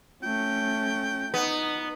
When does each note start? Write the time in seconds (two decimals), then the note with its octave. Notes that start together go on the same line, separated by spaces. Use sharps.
0.23 A3 C#4 G5
1.34 B3 D#4